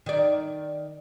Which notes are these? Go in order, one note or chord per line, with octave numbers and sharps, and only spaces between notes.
D#3 D5